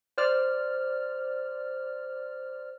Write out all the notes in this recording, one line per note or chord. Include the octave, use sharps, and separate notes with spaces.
C5 D5 F6